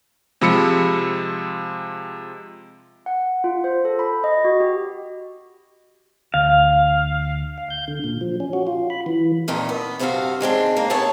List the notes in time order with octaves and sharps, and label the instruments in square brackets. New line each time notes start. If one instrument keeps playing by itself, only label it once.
[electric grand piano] C3 F3 G#3 B5 E6 C#7
[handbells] F#5
F4
C5
A4
B5
D#5
F#4
G4
[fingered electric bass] D2 [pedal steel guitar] F5
[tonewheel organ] F5
G6
D3
A#2
F3
C#4
F#4
F4
B5
E3
[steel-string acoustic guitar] F2 A#2 D#3
B3
G2 C3 A#3 C4 F#4 F5
D#3 G#3 C4 D4
A#3
D#2 B3 C#5 G#5 A5